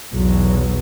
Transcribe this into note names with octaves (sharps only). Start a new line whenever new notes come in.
B1 E2 B2 F#3